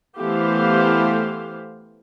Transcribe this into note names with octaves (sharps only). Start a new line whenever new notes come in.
E3 A3 B3 G4 C5 F5